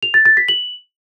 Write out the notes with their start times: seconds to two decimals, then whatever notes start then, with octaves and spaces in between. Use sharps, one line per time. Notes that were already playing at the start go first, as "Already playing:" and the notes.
0.03 F7
0.14 A6
0.26 A6
0.37 B6
0.48 F#7